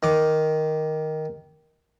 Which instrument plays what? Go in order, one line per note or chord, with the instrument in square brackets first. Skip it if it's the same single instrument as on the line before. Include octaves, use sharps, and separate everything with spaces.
[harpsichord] D#3 D6